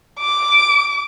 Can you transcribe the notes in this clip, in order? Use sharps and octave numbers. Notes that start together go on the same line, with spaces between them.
D6